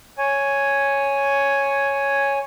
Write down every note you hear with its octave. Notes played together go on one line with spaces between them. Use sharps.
C#5 G#5